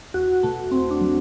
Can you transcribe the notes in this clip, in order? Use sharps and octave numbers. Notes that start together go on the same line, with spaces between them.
E2 F#4
B2 A3
E2 C4
D4
F#3